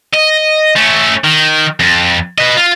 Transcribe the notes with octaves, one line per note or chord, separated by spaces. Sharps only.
D#5
A3 C#4
D#3
F2
B4 D#5
F4